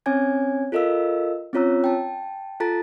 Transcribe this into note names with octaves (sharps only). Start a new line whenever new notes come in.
C4 C#4 C#5 G#5 G#6
F4 A4 A#4 D#5 F5 E6
C4 C#4 F4 C#5 A#5 E6
G5 A5
F4 A4 A5 A#5 A6